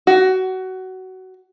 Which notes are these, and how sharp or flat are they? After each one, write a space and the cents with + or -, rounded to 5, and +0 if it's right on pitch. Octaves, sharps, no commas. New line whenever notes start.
F#4 +20